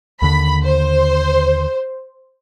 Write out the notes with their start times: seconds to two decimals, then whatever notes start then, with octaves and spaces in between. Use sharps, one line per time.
0.22 D#2 D3 B5
0.64 C5